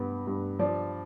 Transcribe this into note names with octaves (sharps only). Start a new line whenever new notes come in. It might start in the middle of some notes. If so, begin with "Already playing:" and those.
Already playing: G2 B3
G2
F3 D5